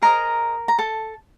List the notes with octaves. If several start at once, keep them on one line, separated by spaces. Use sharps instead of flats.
G#4 A#4 C5 D#5 A#5
A#5
A4 A5